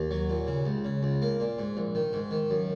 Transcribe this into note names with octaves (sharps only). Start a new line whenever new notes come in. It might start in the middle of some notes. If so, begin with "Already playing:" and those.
Already playing: D#2
F#3
A#2
C#3
C#2
C#3
C#2
A#3
A#2
G#2
A#1
D#3
G#2
D#3
F#2